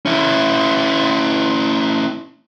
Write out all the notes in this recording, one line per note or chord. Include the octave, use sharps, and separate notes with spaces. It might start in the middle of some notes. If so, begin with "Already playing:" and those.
C#4 E4